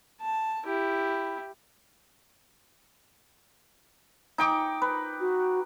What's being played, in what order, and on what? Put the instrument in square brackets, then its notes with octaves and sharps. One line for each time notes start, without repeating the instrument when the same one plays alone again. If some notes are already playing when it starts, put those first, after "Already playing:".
[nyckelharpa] A5
E4 G4
[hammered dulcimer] D#4 G5 D6
B4
[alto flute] F#4